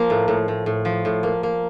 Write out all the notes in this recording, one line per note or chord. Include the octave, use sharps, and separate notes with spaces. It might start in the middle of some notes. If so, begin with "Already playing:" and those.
Already playing: F3 A#3
A2
A2
A2
A2
F3
A2
A#3
A#3